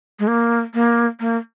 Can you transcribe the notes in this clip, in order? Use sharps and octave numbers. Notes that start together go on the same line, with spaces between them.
G#3
A#3
A#3
A#3